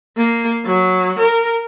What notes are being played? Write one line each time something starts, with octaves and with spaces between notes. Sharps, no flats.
A#3
F#3
A#4